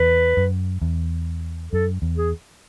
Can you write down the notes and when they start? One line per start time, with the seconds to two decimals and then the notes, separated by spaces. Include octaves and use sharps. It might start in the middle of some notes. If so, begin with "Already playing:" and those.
Already playing: E2 B4
0.37 F#2
0.82 E2
1.72 F#2 A4
2.02 E2
2.17 G#4